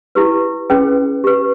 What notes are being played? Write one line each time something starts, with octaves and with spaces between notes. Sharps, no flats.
E4 G4 B4
C#4 G#4 B4 G5
G4 B4